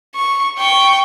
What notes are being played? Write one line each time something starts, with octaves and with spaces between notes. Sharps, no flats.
C#6
G5 C#6